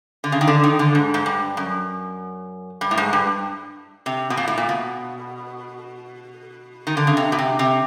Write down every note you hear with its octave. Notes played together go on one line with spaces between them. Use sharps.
D3
C#3
D#3
D3
D#3
D3
G#2
G#2
G2
F#2
G2
A2
G#2
G2
C3
B2
A#2
A2
A#2
B2
D#3
D3
C#3
C3
B2
C3
C3